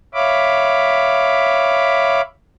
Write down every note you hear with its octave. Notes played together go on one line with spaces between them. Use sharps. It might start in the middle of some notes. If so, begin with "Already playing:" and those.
C#5 E5 F5 B5 D6